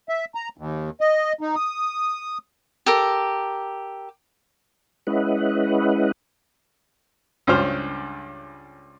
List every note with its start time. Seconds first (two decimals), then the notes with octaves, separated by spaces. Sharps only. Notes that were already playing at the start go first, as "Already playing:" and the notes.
0.09 E5
0.35 A#5
0.58 D#2
1.01 D#5
1.41 D#4
1.56 D#6
2.86 G4 A4 A#4
5.07 G#3 C#4 E4 B4 D#5 F#5
7.47 C#2 G2 C#4 C5 F6